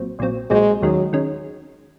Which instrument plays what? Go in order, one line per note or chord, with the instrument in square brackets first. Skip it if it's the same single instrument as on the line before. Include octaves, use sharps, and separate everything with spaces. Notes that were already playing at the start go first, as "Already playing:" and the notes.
Already playing: [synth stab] A#1 A#2 F#3 C4
A#1 A#2 F#3 C4
[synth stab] A#1 A#2 F#3 C4 [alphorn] G#3
[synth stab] D#2 D#3 G#3 C#4 [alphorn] F#3
[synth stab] D#3 G#3 C#4